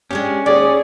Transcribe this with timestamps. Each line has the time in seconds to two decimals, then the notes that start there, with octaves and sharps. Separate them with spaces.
0.11 G#3 C#4 D4 G4
0.46 D#2 G#4 D5